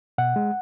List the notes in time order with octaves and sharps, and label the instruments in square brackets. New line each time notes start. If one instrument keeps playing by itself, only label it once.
[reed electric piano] B2 F#5
G#3